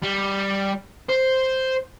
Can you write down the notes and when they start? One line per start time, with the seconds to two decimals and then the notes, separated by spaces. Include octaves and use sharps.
0.03 G3
1.09 C5